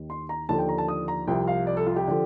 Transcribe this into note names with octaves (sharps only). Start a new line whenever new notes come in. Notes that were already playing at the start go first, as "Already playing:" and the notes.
Already playing: D#2 D#3
C6
A#5
D#2 D3 F3 A5
G5
A#5
A5
D#6
A#5
C2 C3 F3 G5
F5
D5
A4
F4
G4
D3 F3